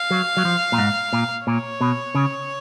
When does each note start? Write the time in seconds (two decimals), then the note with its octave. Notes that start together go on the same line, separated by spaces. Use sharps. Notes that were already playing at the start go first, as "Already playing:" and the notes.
Already playing: F5
0.11 F#3
0.37 F#3
0.45 F3
0.72 A#2
0.78 G#2
1.13 A#2
1.47 A#2 C#5
1.81 B2
2.15 C#3